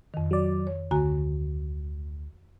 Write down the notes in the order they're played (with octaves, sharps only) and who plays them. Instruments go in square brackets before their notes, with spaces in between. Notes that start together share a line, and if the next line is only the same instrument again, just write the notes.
[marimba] F2 D#3
[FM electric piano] F#3 D5
[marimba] C#5
[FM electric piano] D2 [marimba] F#4 G#5 A#5